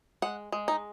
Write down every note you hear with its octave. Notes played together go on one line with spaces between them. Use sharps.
G#3 F#5
G#3
D#4